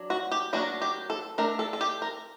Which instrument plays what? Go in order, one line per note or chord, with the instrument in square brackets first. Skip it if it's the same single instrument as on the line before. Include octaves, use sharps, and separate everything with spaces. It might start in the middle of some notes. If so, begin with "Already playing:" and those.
Already playing: [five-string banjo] F#3 D4
F#4
G4
F#3 A#3 D4 F#4
G4
A4
A3 D4 A#4
A4
A4
G4
A#4